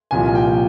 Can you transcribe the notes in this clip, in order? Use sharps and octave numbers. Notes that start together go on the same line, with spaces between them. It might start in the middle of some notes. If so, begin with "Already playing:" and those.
C2 A#2 F3 G#5
G5